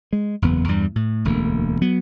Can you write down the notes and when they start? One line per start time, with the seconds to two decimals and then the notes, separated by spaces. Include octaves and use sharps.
0.13 G#3
0.42 F#1 E2 B3
0.68 E2 G2 G3
0.95 A2
1.25 E1 D2 A3 A#3
1.82 F#3 B3